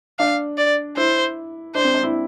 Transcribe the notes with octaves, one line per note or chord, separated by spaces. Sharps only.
D4 F5
D5
E4 C5
D4 C5
C4
D4
E4